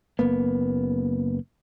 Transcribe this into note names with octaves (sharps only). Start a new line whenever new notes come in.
F#1 A#3 B3